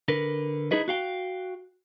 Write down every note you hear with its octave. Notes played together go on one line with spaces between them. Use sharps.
D3 A#4 B4
D#4 E4 G#4 B4 D#5
F#4 F5 G5